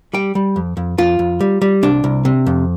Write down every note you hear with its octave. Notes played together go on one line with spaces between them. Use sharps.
G3 G5
G3
F2
F2
F2 F4
F2
G3
G3
C2 D4
C2
C3
F2